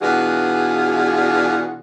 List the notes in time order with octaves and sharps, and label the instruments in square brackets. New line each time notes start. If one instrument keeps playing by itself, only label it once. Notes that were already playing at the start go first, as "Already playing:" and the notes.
[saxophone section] B2 E3 D4 F4 F#4 G#4